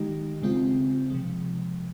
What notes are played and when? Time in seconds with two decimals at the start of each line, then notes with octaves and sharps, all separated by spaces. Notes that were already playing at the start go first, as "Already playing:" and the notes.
Already playing: D#3 G#3 D#4 G4
0.42 C#3 G#3 C4 F4
1.10 C3 F3 G#3